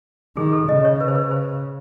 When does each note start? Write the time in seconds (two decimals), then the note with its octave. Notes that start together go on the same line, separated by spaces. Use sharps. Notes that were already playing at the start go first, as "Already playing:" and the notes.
0.37 D#3 G#4
0.52 A4
0.69 C#3 D#5
0.85 C#5
1.00 B4
1.08 C5
1.15 B4
1.31 C5